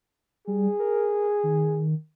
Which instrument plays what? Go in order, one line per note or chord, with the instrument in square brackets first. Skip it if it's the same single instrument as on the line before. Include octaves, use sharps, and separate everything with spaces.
[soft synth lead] G3 [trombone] G#4
[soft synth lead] A#4
D#3